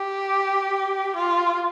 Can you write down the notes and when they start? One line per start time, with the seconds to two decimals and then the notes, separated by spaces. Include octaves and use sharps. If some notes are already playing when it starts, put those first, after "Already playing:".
Already playing: G4
1.16 F4